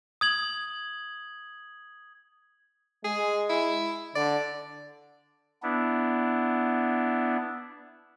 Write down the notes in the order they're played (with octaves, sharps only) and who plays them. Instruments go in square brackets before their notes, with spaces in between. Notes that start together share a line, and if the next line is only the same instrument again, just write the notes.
[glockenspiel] D#6 G#6 F#7
[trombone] G#3 [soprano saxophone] G#4
[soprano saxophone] E4
[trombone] D3 [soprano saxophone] D5
[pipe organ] B3 D4 E4